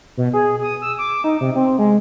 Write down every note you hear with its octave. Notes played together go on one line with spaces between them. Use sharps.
B2
G#4
D#6
E6
D6
D#4
C3
C4
G#3